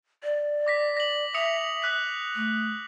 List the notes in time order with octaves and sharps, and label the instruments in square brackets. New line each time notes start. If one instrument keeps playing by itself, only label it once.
[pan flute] D5
[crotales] D6 A#6 B6
A#6 F#7
[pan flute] E5 [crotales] D#6 C#7 F7
[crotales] D#6 F#6 B6
[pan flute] A3